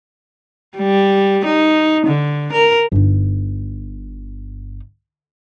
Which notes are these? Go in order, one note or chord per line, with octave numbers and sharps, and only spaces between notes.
G3
D#4
D3
A#4
G1 D#4